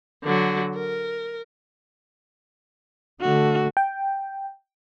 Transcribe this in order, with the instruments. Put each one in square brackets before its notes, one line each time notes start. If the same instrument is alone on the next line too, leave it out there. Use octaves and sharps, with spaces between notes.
[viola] D3 F#3
A#4
[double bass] D3 A3 [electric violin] F#4
[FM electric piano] G5